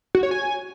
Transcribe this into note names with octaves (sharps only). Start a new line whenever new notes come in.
F#4
C#5
G#5